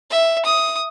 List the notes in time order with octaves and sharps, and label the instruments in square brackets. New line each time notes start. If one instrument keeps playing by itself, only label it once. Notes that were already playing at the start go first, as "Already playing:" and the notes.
[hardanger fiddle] E5
D#6